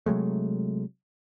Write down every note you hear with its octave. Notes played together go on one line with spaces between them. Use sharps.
C3 F#3 G#3 A3